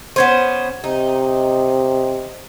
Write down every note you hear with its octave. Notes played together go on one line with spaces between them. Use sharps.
B3 C#4 C5
C3 D#4